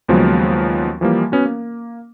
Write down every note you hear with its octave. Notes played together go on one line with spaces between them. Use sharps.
D#2 C#3 F3 F#3 G#3 B3
E3 F3 G3 A#3
B3 C#4 F#4
A#3